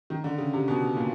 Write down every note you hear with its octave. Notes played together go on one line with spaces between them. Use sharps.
D#3
D3
C#3
C3
B2
A#2